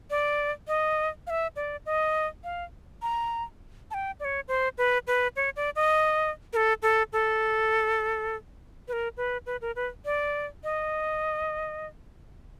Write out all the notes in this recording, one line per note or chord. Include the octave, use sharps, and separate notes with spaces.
D5
D#5
F5
E5
D5
D#5
F5
A#5
A5
G5
D5
C#5
C5
B4
B4
C#5
D5
D#5
A#4
A4
A4
A4
B4
A#4
B4
B4
A#4
B4
D5
D#5